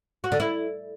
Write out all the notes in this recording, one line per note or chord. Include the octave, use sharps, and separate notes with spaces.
F#4
D3
E4